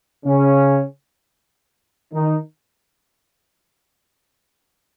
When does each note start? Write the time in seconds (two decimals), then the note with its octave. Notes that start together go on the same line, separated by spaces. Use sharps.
0.26 C#3 C#4
2.13 D#3 D#4